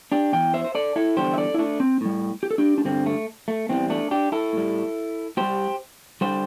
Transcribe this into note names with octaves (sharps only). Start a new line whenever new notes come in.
D4 G4
E2 E3 G5
C5 E5
C5
A4 D5
E4 A4
E2 D3 G3 G4 C5
E5
A4 D5
E4
A3 D4
C4
A2 G3
G4
A4
D4 G4
D4
G2 D3 G3 C4
A3
A3
E2 E3 G3 C4
A3 D4
D4 G4
E4 A4
A2 G3
A2 G3 G4 C5
D3 G3 G4 C5